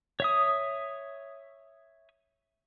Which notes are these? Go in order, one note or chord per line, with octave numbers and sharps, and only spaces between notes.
C#5 E5 D#6